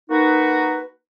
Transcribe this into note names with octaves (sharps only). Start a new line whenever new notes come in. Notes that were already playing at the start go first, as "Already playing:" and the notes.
A#3 D#4 F#4 B4